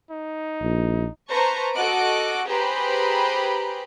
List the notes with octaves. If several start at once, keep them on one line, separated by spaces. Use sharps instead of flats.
D#4
A#1
B4 C5 A5 A#5 C#6
F#4 A4 D#5 D6 F#6 D7
G4 G#4 B4 C5 A#5 B5